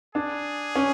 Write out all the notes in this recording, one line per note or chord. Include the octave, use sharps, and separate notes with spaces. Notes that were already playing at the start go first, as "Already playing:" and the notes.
D4 G#4
C#4